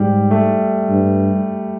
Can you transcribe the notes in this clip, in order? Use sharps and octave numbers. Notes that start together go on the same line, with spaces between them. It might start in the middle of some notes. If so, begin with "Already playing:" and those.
Already playing: G#2 G3
A3
G2